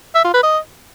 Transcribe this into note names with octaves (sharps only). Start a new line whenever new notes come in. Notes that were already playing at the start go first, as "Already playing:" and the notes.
E5
F4
B4
D#5